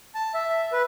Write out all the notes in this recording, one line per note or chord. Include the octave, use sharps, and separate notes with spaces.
A5
E5
B4